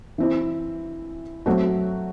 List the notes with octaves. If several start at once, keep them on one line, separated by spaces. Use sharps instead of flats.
E3 C4 E4
F#3 A3 C4 F#4